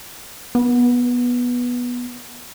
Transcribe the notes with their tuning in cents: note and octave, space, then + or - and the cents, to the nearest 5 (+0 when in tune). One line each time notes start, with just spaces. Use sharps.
B3 -15